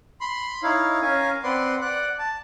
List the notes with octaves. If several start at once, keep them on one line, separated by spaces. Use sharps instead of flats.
B5 C6
D#4 E4 C#5 F5
C#4 A#4 C#5 F5 G#5
C4 B4 D5 F#5 C6
D5 F#5 F#6
A5